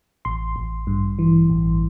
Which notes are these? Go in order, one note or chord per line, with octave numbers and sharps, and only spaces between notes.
A1 C6
A1
G2
E3
A1